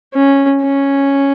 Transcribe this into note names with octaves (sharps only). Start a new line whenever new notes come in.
C#4
C#4